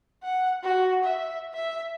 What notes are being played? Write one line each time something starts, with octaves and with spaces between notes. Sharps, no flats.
F#5
F#4
E5
E5